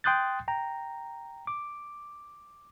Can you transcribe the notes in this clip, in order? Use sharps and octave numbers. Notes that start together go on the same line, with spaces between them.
G5 C6 D#6 F#6 G6 A6
G5 A#5
D6